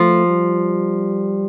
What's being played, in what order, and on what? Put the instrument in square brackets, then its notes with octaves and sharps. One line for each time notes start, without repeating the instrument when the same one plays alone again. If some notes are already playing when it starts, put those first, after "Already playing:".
Already playing: [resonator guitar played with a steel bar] F3 [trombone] A3
[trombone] G3